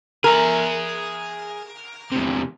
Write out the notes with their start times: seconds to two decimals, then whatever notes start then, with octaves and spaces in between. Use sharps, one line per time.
0.24 G#4 A#4 E5
2.12 E2 C3